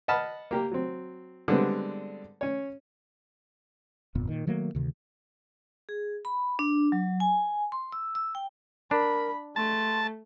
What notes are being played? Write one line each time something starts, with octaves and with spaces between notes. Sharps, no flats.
D#5 F#5 A5 B5 F6
A#3 G4 A#4
F#3 C4
D3 G3 G#3 B3 C4
C#4 C#5
G1 F2 A#2 B3
A#2 D#3
D#3 F#3 A3 A#3
D2 C3 D#3
G#4
B5
D4
F#3
G#5
C6
E6
E6
G5
D4 A#4 B5
A3 A5 C6